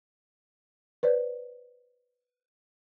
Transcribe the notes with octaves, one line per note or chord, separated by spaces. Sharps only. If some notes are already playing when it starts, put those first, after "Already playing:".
B4 C5 D5